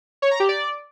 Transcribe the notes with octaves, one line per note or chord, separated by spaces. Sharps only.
C#5
A#5
G4
D5